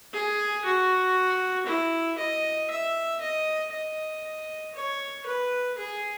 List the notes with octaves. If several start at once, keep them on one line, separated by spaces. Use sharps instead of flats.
G#4
F#4
E4
D#5
E5
D#5
D#5
C#5
B4
G#4